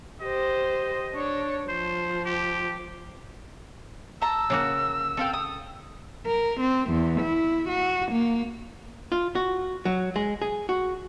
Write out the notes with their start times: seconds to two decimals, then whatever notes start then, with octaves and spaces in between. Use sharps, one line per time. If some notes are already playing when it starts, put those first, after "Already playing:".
0.21 G4 C5 D#5
1.14 D4 C#5
1.69 F3 C5
2.25 G4
4.22 A5 A#5 E6
4.50 C#3 A#3 F#4
5.17 C4 A4 F5 G5
5.34 D#6
6.26 A#4
6.60 C4
6.90 E2
7.21 E4
7.69 F#4
8.12 A#3
9.12 F4
9.35 F#4
9.85 F#3
10.16 G#3
10.42 G#4
10.69 F#4